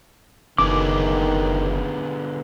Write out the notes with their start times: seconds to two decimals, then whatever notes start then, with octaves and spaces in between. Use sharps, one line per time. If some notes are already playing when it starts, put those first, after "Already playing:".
0.58 F#1 D3 D#3 B3 G#4 D6